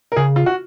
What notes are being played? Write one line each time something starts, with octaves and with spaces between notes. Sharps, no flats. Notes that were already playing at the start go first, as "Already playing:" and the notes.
A#4
C#3 G#4
F4
F#4